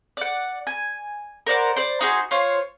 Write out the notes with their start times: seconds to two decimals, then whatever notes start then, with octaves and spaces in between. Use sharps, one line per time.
0.17 D5 F#5
0.67 G#5
1.47 A#4 C5 D5 F#5
1.76 C5 D5
2.01 D#4 F#4 G#4 C5
2.31 F4 C5 C#5